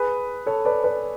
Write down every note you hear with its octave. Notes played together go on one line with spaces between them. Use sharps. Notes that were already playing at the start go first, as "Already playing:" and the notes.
Already playing: G#4 B4
A4 C#5
B4 D5
B4 D5